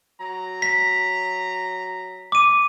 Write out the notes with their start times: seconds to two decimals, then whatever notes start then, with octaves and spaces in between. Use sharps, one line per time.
0.20 F#3 A#5
0.62 B6
2.32 D6 D#7